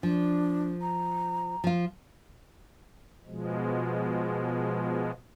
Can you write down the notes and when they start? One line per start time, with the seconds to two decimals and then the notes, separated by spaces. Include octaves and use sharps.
0.03 F3 D4
0.81 A#5
1.64 F3 F4
3.27 B2 F3 G#3